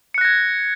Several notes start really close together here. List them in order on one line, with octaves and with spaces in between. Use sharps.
C#7 F#6 A#6 G#6